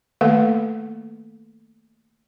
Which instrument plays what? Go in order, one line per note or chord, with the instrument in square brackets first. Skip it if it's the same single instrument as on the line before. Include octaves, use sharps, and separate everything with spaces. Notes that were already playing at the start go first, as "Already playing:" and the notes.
[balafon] D#3 A3 A#3 A4 B4 F#5